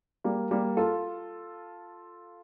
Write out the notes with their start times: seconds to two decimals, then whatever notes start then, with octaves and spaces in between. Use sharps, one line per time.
0.24 G3 A#3
0.51 G3 A#3
0.77 F4 A4